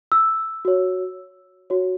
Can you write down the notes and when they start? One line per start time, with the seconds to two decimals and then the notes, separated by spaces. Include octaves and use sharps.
0.12 E6
0.65 F#4 C#5
1.70 F#4 C#5